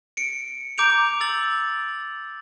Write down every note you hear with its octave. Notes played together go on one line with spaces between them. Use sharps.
C#7 D7
A#5 D6 G6 D7 F7
E6 A6 F#7